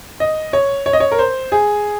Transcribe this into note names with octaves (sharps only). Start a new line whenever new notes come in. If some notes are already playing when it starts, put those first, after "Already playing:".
D#5
C#5
C#5
D#5
C#5
A#4
C5
G#4